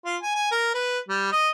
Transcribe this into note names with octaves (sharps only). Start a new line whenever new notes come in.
F4
G#5
G#5
A#4
B4
G3
D#5